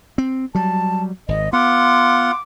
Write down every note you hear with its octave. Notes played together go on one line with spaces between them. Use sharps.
C4
F#3 G3 A5
G#1 D#5
B3 F4 F#5 D6